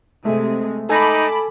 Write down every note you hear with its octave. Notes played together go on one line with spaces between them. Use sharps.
C3 G#3 A3
D#4 A4 G#5 A5 B5 D6